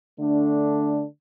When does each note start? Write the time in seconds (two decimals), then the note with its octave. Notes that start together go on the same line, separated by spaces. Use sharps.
0.18 D3 A3 D4